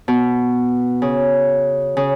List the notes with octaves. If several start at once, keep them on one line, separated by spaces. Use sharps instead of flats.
B2
C#3
C#3